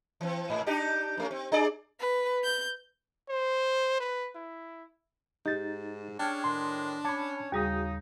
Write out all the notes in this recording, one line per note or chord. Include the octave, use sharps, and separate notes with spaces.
E3 C4
G#2
D4 D#4 G4
G2 A3 C#4
C4
D4 G#4 D5
B4
G6
C5
B4
E4
G#2 D#4 G4 A6
C#4 D4 G#4 C#5 G5 A5 F6
A2 D#3 G#3 C6
C#4 C#5 A5 B5 D6 G#6
D#2 C#3 G3 D#4 F#4 G#4 D#6